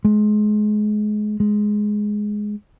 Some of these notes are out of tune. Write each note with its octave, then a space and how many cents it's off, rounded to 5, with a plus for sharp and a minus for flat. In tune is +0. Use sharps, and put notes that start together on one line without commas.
G#3 +25
G#3 +5